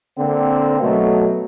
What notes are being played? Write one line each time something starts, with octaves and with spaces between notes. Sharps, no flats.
D3 A#3 C4
B2 F#3 A3